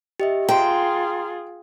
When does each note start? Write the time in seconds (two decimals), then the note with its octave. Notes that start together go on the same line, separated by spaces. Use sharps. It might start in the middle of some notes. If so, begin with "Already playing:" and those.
0.20 G4 D#5 E5
0.49 F4 G#4 G5 A#5 C6